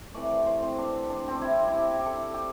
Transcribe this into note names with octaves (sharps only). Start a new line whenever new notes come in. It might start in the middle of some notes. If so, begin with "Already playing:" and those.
C3 E3 A3 D5
C5
C5
C4
D4
D4
C4
D4
C3 G3 E4
E4
G4
G4
A4
G4